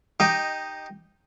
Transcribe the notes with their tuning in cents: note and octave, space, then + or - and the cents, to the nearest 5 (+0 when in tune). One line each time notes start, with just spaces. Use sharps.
D#4 -5 G4 +0 D#5 +0